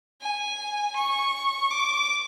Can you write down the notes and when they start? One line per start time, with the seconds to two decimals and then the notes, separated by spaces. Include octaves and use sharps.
0.21 G#5
0.96 C#6
1.70 D6